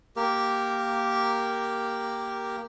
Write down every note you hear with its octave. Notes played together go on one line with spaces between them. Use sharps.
A#3 G4 A#4